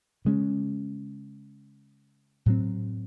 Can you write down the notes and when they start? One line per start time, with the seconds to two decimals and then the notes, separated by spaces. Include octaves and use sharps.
0.25 C#3 G#3 C#4
2.46 A2 F#3 C4